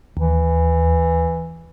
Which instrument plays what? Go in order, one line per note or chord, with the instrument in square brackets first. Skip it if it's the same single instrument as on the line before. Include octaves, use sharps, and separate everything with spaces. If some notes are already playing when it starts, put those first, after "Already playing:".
[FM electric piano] D#2 [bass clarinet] E3